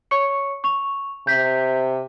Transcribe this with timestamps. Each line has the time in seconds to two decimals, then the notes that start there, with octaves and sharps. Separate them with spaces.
0.11 C#5 C#6 C#7
0.64 C#6 F7
1.27 C3 G6 B6